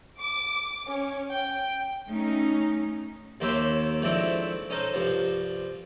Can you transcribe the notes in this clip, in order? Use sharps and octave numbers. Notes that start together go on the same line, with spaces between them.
D6
C#4
G5
A3 C#4 D#4
D#2 A#3 C5 C#5 E5 G5
G#2 F3 A3 C4 D4 E4
C#4 D#4 A4 C5
C2 G2 F3 C5